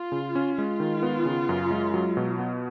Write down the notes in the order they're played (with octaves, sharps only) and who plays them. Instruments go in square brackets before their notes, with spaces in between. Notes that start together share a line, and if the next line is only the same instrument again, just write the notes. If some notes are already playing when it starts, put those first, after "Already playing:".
Already playing: [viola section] F4
[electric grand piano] C#3
C#4
[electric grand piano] G#3 [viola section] F4
[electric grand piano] D#3
B3
C#3
F#2
G#3
F#3
B2
B3